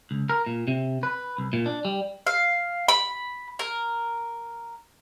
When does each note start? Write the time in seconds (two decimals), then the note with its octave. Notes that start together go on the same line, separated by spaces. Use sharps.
0.11 C#2
0.30 A#4
0.46 A#2
0.68 C3
1.03 B4
1.38 C2
1.53 A#2
1.66 D4
1.85 G3
2.27 F5
2.88 B5
3.59 A#4